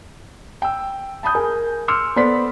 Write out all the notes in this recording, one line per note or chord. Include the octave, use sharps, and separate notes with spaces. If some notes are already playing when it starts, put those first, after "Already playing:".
G5 E6
A5 B5 D#6 G6
G#4 A#4 G#5
C6 D6 E6 F6 C#7
B3 A4 C5 D5 C6 B6